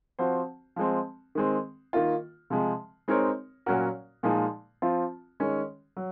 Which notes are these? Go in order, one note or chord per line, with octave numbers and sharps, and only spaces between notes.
F3 C4 F#4 C5
F3 G#3 C4
D#3 G#3 C4
D#3 A#3 F4
C3 F3 G#3
G#3 C4 D#4 A#4 C#5
A#2 F#3 C#4 F#4 A#4
A#2 F3 G#3 D#4
F3 C4 F4
D#3 G#3 C#4
F#3